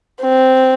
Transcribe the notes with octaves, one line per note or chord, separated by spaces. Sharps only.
C4